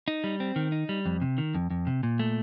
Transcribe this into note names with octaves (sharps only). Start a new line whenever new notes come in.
D#4
G3
C4
D#3
D#4
G3
F2
C3
D#3
F2
F2
C3
A#2
A3